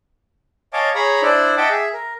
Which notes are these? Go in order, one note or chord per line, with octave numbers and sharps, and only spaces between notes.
C#5 D#5 F5 G#5 A5 D6
G#4 C#5 A#5 B5
D4 E4 C5 D5
D#5 E5 F#5 G5 A5 D6
G#4 E5
A#4